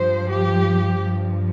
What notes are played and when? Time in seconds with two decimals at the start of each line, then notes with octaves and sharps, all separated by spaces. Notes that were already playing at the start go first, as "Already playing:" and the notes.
Already playing: G2 F3 C5
0.31 G4
0.99 G2 F3